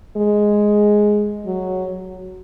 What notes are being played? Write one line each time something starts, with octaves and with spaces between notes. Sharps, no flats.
G#3
F#3